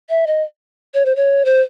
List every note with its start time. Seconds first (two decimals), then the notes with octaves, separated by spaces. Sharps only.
0.10 E5
0.27 D#5
0.94 C#5
1.06 C5
1.16 C#5
1.45 C5